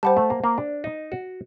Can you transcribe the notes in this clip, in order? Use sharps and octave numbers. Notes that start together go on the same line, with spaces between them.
G3 C5 F#5 A5
A3
A#3
A#3
D4
D#4
F#4